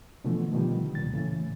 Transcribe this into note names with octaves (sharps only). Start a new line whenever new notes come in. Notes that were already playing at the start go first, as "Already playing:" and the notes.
B2 D3 E3 F3 A3
B2 D3 D#3 F3 G3
C#2 A#2 A6
A2 C#3 E3